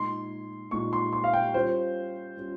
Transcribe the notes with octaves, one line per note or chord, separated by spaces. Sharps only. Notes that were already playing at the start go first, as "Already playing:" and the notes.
Already playing: A#2 G#3 D#4 C6
A#2 G#3 D#4 C#6
C6
C6
F5
G5
G3 C#4 F4 C5
G3 C#4 F4